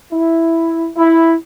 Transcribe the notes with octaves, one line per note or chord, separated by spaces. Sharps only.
E4
E4